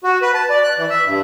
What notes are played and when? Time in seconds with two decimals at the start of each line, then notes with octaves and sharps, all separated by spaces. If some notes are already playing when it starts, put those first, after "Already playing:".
0.04 F#4
0.22 B4
0.34 A5
0.50 D5
0.64 F#6
0.78 E3
0.90 E5
1.06 G2